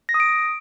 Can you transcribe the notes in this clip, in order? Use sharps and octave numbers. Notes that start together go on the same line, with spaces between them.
A#6
D#6
D7